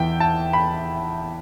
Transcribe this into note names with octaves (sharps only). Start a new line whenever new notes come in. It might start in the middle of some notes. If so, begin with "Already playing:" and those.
Already playing: E2 E3 E5 G5
A5
B5